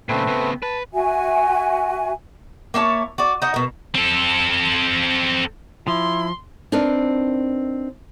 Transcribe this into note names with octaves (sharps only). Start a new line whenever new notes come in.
A#2 C#3 A3 C4 B4
C#3 B3
B4 A5
F#4 E5 G#5
A#3 E4 C#5 A5
F#4 D5
D#4 F#4 D#5
B2 A#4
C4 A4
F3 E4 C6
C4 D4 D#4 A#4 B4